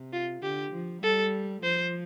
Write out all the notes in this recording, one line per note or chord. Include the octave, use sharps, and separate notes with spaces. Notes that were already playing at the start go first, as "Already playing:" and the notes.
Already playing: C3
F4
D3 G4
F3
G3 A4
F3 C5